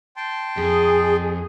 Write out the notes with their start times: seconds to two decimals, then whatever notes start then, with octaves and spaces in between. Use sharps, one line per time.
0.17 G5 A5 C6
0.57 F2 G#4